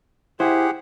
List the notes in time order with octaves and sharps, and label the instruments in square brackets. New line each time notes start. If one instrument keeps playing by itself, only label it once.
[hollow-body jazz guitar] E4 C5 [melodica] G4 G#4 F#5